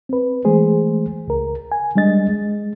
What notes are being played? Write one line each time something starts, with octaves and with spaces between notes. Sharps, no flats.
C4 B4
E3 G#3 A3 G#4 C5
C#2 A#4
G#5
G3 G#3 D4 D#5 A6
G#3